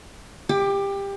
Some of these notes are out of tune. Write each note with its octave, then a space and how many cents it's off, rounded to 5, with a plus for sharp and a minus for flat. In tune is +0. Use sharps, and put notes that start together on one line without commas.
G4 +20 D6 +0